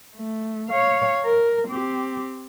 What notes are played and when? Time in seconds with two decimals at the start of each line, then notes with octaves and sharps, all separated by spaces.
0.16 A3
0.69 C#5 F5
1.25 A#4
1.68 C4 G4